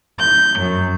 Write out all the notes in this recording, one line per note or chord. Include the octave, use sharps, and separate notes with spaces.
G6
F#2